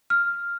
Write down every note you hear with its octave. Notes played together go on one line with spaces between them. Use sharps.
F6